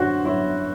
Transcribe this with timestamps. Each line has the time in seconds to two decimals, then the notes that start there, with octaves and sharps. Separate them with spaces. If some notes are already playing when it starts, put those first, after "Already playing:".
Already playing: F#2 D3 F#4 C5
0.24 F#2 E4